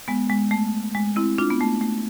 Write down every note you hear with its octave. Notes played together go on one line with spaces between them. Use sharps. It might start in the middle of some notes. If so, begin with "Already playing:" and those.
G#3 B3
G#3
A3
G#3
C4 E4
D4 F4
B3
A3
A3